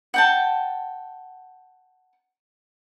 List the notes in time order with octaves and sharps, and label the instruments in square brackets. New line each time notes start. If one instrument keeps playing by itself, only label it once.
[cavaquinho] F#5 G5 A5